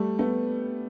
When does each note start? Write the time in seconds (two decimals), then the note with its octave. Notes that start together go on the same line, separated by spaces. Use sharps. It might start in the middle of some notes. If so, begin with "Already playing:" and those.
Already playing: G3 A3
0.19 A3 B3